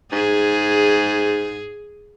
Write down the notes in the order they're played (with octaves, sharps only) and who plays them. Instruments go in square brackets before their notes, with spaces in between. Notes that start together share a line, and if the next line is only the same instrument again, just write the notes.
[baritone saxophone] G#2 [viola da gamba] G#4